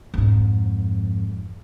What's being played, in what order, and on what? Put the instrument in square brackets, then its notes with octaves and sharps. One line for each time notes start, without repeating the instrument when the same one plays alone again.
[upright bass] F2 G#2